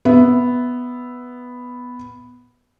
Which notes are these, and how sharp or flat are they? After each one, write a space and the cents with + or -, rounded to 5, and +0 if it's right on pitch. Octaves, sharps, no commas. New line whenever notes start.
B3 +0 E5 +0